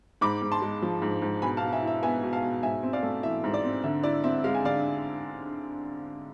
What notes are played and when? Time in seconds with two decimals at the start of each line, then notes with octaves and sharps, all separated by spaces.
0.21 G#2 B5 D6
0.42 G#2
0.52 A5 C6
0.62 G#3
0.82 F3
1.02 G#2
1.22 G#2
1.42 B2 G#5 B5
1.57 F5 A5
1.62 B2
1.72 E5 G#5
1.83 E4 E5
2.02 B3 E5 G#5
2.23 B2
2.33 F5 A5
2.43 B2
2.63 G#2 E5 G#5
2.83 C4
2.93 D5 F5
3.03 A3
3.23 E3 E5
3.44 G#2
3.54 D5
3.64 C4
3.84 D3 E5
4.03 E4 D5
4.24 C4 E5
4.44 G#3 F5
4.54 G#5
4.64 D3 D5 F5